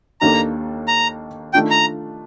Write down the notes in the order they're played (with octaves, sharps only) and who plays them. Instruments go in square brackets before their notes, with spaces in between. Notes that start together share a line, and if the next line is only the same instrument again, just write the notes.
[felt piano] D#2 D#3 A#3 D4 A4 [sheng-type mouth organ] A#5
[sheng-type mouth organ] A#5
[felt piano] D#3 A3 D4 F4 [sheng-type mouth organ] G5
[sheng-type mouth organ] A#5